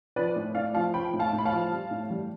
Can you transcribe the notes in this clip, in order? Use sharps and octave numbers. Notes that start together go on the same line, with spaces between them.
F3 B4 D5
A2
A2 D5 F5
F3 F5 A5
F3 G5 B5
A2
F5 A5
A2
B5
F5 A5
F3
G3
A2
G3